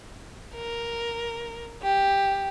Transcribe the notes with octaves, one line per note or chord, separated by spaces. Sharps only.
A#4
G4